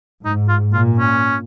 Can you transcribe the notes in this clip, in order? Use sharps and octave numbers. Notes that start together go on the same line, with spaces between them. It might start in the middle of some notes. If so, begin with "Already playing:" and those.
G#2 D#4
F4
A#2 F4
C#4